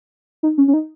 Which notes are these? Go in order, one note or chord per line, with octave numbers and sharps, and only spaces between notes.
D#4
C#4
C#4
D#4